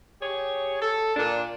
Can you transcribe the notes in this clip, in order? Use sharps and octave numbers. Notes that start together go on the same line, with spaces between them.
G4 G#4 C#5
A4
A#2 D4